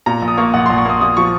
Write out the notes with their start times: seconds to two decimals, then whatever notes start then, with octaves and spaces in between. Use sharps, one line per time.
0.06 A#2 A#5
0.22 A#1
0.28 D#6
0.38 A#3 C#6
0.54 A#1 F#5
0.66 A#1 C6
0.78 C#6
0.85 A#3 D#6
1.01 A#2 D#6
1.17 F3 C#6